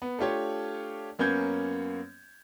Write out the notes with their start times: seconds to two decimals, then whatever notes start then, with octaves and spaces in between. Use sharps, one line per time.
0.02 B3
0.19 A3 D4 F4 G4 C#5
1.19 F#2 A#3 B3 C#4 G6 G#6